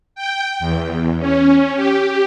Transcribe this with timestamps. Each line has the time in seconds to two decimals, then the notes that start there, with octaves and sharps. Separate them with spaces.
0.15 G5
0.60 E2
1.19 C#4
1.75 G4